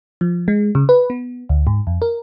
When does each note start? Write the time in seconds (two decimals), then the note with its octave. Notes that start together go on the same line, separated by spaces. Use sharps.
0.21 F3
0.48 G#3
0.75 C#3
0.89 B4
1.10 B3
1.49 D2
1.67 G#2
1.87 F2
2.02 A#4